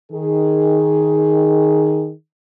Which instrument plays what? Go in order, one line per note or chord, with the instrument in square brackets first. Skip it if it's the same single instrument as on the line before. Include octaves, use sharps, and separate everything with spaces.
[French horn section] D#3 G#4